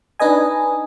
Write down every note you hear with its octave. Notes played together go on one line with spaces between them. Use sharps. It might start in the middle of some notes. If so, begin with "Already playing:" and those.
D4 D#4 B4 D#5 G#5